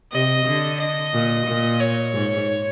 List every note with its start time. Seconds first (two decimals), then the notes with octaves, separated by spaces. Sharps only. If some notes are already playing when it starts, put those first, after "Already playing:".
0.13 C3 D#5
0.46 D3
0.80 D#5
1.13 A#2
1.47 A#2
1.80 C#5
2.13 G#2